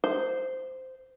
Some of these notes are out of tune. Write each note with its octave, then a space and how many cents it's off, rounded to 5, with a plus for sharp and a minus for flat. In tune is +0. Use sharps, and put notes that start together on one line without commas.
C5 -10